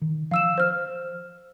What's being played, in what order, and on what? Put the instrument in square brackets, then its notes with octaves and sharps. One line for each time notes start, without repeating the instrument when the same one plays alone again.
[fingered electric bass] D#3
[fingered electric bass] F3 [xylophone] F5 E6 E7
[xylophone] C5 F6